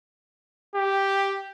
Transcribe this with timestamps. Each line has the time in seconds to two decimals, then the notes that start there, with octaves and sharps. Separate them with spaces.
0.75 G4